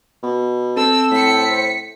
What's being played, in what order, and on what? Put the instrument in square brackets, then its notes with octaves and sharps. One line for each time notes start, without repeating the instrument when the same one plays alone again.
[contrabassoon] B2
[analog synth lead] C4 [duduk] A4 [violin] E6
[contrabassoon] A2 [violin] B6 C#7